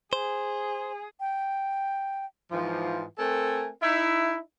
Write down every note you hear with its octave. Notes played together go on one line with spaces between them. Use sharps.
G#4 C5
G5
G#2 E3 F3
A3 C4 A4 A#4 G#5
D#4 E4